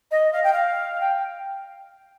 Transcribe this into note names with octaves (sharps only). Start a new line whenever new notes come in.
D#5
F5
G5
F5
G5